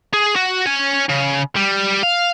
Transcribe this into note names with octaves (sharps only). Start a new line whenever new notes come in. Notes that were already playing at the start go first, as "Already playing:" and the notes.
G#4
F#4
C#5 G#5
C#3
G3
F5